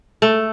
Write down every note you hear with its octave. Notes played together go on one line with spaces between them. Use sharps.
A3